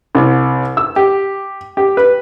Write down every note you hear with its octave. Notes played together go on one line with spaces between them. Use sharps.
C2
E6
G4
G4
B4